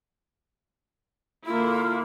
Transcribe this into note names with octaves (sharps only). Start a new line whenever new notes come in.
D3 A#3 E4 F4